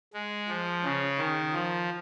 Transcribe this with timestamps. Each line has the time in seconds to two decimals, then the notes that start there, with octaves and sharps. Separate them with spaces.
0.14 G#3
0.48 F3
0.84 C#3
1.18 D#3
1.53 F3